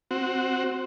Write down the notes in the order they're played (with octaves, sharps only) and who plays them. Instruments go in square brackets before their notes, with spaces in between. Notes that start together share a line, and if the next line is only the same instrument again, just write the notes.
[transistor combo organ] C4 F#4